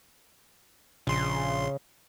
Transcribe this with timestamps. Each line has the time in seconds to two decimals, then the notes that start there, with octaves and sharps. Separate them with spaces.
1.07 A#1 C#3 C6